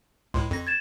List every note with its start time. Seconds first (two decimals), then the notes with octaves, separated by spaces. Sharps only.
0.34 C#2 A2 C6
0.51 F2 A#6
0.67 G#6 A6 E7